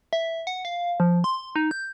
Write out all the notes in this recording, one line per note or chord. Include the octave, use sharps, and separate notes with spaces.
E5
F#5
F5
F3
C6
D#4
G6